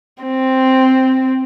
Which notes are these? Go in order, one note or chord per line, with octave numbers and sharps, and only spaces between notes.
C4